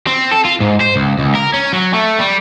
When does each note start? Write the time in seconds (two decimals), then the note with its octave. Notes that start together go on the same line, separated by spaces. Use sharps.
0.07 C4
0.31 A4
0.45 F4
0.60 G#2
0.81 C5
0.96 C#2
1.19 C#2
1.35 A#4
1.54 C#4
1.73 F#3
1.94 A3
2.19 G3